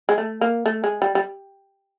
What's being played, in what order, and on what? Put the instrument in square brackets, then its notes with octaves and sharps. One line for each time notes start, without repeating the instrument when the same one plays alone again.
[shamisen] G#3
A3
A#3
A3
G#3
G3
G3